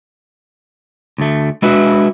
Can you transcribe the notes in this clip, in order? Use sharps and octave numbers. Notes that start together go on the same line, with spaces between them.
D2 A3
G#3 D4 E4 F#4 B4 E5